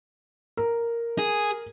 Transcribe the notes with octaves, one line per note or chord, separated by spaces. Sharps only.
A#4
G#4